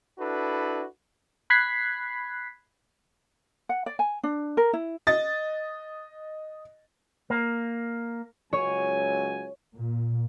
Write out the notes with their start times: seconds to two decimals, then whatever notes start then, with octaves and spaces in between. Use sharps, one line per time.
0.19 D4 E4 F#4 A4 B4
1.50 B5 F#6 G#6 B6 C7
3.69 F#5
3.86 D5
3.99 G#5
4.23 D4
4.57 A#4
4.73 E4
5.07 D#5 A6
7.30 A#3
8.53 C#2 F#3 C#5 G#5
9.74 A#2